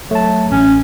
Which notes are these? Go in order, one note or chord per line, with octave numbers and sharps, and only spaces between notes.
F#3 A3 A5
A1 C#4